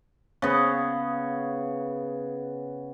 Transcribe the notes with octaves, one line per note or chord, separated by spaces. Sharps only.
C#3 B3